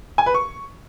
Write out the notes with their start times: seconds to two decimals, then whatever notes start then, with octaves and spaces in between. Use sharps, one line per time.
0.18 G#5
0.26 B4
0.34 C#6